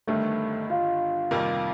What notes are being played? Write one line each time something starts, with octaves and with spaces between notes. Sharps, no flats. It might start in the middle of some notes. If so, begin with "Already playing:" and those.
G1 G2 D#3 A3
F4
F2 C3 D#3 G3 A#3